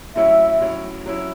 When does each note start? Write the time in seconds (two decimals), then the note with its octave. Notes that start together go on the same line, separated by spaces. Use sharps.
0.16 A2 F#3 C#4 E4 E5
0.61 A2 F#3 C#4 E4
1.06 F#3 C#4 E4